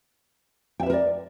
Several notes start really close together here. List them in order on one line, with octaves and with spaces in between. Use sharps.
G5 E5 B4 A#4 D5